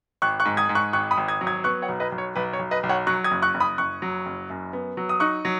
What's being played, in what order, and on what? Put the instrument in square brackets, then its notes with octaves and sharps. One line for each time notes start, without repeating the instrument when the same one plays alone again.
[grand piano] G#1 C#6 F#6
C#6 F#6
G#2
D#6 G#6
G#2
C#6 F#6
G#1 C#6 F#6
B5 D#6
G#1
D#6 G#6
F#3
D#6 G#6
B3 C#6 F#6
C#5 F#5
B1
B4 D#5
B1
C#5
B1 B4
C#5
B1
B4 D#5
B1
C#5 F#5
F#3 C#6 F#6
D#6 G#6
F#1
C#6 F#6
F#1
B5 D#6
F#1 C#6 F#6
F#3
F#1
F#2
B3
F#3
D#6
D#4 C#6 F#6
F#3